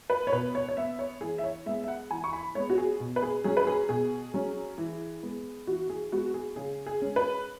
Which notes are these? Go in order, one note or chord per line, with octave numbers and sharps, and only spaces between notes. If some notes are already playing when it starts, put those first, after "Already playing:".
B4
C#5
B2 B4
C#5
C#5
B3 E5
C#5
E3 G#4
E5
C#5
G#3 B3 E5
E5
F#5
E3 G#5
C#6
B5
G#3 B3 C#5
F#4
G#4
B2
B4
G#4
F#3 C#4 G#4
B4
G#4
B2 G#4
F#3 C#4
E3
G#3 B3
E3 F#4
G#4
G#3 B3 F#4
G#4
C#3 G#4
G#4
G#3 C#4
B4